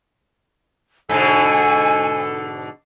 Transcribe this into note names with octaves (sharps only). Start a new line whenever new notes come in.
G#2 B2 D3 A4 G#5